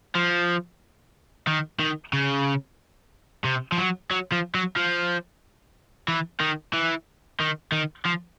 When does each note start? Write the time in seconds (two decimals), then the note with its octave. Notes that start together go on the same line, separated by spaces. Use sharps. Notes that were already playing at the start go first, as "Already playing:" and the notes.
0.16 F3
1.48 D#3
1.80 D#3
2.13 C#3
3.45 C3
3.72 F3
3.78 F#3
4.11 F#3
4.32 F3
4.55 F#3
4.76 F3
6.08 E3
6.40 D#3
6.73 E3
7.40 D#3
7.72 D#3
8.05 F3